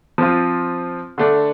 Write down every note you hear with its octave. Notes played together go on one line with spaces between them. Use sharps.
F3 C4 F4
D3 A3 D4